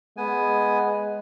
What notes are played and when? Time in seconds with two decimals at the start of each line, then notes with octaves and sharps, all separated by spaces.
0.17 G#3 B3 G#5